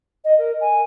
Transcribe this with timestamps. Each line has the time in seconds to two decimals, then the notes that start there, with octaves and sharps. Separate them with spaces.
0.24 D#5
0.38 A#4
0.61 G#5